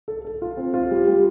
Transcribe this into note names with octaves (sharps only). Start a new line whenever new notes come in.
A4
A4
F4
C4
F4
G3
G3